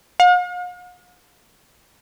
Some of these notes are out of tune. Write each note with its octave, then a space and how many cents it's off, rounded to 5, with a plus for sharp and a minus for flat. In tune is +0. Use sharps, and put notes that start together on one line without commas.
F5 +45